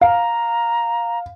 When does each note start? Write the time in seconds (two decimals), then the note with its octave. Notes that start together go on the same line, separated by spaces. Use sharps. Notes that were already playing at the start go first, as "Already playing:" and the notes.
0.01 F5 A#5